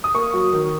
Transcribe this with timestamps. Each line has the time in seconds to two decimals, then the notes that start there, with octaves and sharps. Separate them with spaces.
0.04 D#6
0.14 A#3 C#6
0.33 F#3
0.53 D#3